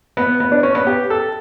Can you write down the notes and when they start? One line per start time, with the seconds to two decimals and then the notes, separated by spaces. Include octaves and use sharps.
0.17 B3
0.40 B3
0.52 D4
0.63 C#4
0.75 B3
0.87 G4
1.10 A4